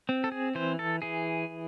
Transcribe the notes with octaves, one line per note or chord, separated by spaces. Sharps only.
C4
A4
G#4
E3 C5
A4
E3 G#4